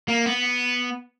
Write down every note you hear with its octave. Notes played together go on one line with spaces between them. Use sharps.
A#3
B3